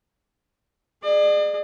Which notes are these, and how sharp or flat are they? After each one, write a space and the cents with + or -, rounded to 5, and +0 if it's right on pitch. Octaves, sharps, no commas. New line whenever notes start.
G#4 +0 D5 +40